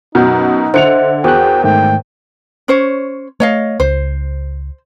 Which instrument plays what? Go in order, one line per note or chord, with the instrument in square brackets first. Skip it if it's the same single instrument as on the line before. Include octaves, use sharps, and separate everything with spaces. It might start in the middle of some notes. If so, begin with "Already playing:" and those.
[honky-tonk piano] F#2 B2 F#3 [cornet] D#4 [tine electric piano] F6 G6
[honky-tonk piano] D3 C#7 F7 [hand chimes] C5 D#5 E5
[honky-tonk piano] E2 [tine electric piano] F#4 G#4 F#6 [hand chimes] A#4 C5 [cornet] G5
[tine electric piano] G#2 D#3 A3 [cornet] G5
[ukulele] C#4 C5 C#5
[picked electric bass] A3 [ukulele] C#5 D#5 F5
[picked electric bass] C#2 [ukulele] C5